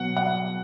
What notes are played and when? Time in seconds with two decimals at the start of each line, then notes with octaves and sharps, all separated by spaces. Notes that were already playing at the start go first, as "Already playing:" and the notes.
Already playing: B2 F#3 F#5
0.17 F#5